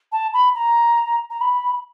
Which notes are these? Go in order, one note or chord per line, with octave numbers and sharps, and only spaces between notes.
A5
B5
A#5
A#5
B5